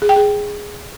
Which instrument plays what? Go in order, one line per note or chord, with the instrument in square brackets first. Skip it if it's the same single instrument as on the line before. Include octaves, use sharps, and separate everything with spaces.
[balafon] G#4
G5
G#4